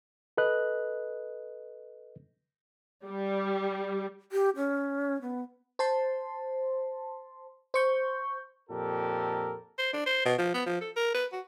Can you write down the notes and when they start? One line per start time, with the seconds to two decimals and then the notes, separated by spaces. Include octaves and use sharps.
0.37 A4 B4 D#5 F#6
3.06 G3
4.32 G4
4.57 C#4
5.22 B3
5.79 C5 A5 C6
7.74 C5 C#6 G6
8.70 F2 A#2 G4 A4 A#4
9.78 C5
9.93 D4
10.06 C5
10.25 B2
10.38 F3
10.54 B3
10.66 F3
10.81 A4
10.97 A#4
11.15 B4
11.32 F#4